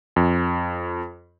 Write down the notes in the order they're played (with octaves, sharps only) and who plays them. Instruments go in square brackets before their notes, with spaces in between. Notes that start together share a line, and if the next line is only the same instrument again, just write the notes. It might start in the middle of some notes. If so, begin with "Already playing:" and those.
[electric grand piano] F2